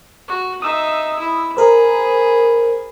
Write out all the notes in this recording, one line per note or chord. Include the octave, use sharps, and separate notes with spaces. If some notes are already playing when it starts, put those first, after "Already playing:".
F#4
D#4 E5 D#6 E6
E4
G#4 A#4 C5 B5